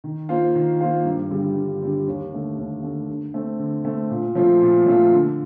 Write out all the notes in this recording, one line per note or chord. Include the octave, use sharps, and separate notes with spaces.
D#3
A#3 F4 C5 F5
D#3
A#3 F4 C5 F5
G2
D3 G3
G2
D3 G3
D#2
D3 A3
D#2
D3 A3
D3
A3 C4
D3
A3 C4
A#2
F3 A3 C4 F4
A#2
F3 A3 C4 F4
D3